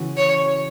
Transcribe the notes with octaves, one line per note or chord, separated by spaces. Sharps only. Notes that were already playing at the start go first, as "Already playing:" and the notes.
Already playing: C#3 E3 C#4 F#4
C#5